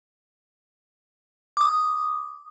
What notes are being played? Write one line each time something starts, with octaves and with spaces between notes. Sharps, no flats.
D6 D#6